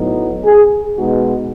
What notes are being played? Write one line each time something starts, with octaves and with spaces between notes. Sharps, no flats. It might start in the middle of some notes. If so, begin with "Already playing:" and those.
Already playing: A2 F#3 B3 D#4
G#4
B2 G#3 B3 D#4 F#4